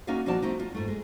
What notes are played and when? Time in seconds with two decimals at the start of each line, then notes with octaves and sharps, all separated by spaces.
0.07 A#3 C#4 D#4 F#4 D5 F5
0.26 B2 F3 D#4 F#4 D5 A5
0.42 A3 C4 D#4
0.59 F4
0.74 G#2 A3
0.88 G#3